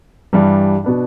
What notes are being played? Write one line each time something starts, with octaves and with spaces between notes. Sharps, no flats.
G2 E3 G3 D4
B2 B3 D4